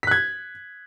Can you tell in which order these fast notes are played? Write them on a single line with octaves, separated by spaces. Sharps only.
B6 F#6 G#6